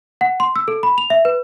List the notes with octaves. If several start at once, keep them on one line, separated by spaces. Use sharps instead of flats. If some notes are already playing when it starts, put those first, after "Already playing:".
F#5
C6
E6
A4
B5
F7
E5
B4